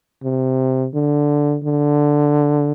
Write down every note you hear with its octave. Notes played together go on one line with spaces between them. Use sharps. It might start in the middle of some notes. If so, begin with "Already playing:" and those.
C3
D3
D3